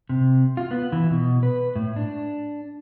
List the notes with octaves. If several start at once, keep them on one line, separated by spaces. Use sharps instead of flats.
C3
F4
B3
E3
B2
B4
A2
D4